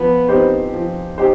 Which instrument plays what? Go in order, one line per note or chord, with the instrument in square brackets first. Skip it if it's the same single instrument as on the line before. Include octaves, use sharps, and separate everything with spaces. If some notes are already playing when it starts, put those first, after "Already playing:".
Already playing: [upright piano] F3 [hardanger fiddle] B3
[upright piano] C4 D#4 G4 C5
F3
D#4 G4 C5